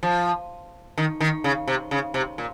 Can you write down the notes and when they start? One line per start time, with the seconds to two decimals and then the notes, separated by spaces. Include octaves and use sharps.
0.03 F3
0.98 D#3
1.21 D#3
1.44 C#3
1.68 C3
1.91 C#3
2.14 C3
2.38 A#2